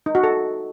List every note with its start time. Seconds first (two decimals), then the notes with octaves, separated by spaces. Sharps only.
0.06 D#4
0.15 F#4
0.24 A4